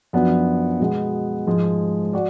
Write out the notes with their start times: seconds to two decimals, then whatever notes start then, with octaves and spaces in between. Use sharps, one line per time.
0.13 F#2 F3 B3 D4
0.80 B2 G#3 B3
1.47 G#2 F3 G#3
2.13 F#4 D5